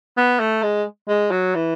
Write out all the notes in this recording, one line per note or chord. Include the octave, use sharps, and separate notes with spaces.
B3
A3
G#3
G#3
F#3
E3